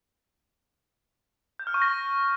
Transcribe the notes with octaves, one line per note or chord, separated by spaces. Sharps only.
G6
F6
C#6
A#6